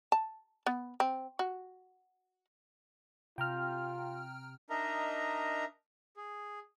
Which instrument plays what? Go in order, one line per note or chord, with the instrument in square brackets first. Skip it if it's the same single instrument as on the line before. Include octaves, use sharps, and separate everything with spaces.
[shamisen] A5
B3
C4
F#4
[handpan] C3 [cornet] F4 [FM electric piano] G5 A#5 F6
[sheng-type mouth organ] D4 D#4 A#4 D#5 E5 A#5
G#4